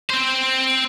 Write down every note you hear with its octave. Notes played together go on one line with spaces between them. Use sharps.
C4 C5